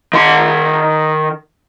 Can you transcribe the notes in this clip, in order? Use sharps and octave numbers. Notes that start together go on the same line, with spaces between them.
D#3 C6